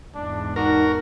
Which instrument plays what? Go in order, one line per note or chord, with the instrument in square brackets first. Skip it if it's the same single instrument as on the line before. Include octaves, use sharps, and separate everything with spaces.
[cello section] E2 G#2 [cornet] D4
[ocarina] D#4 [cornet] F#4 [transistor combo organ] A#4